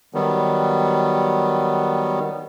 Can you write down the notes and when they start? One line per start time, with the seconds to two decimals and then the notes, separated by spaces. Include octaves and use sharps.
0.14 D#3 F#3 G3 B3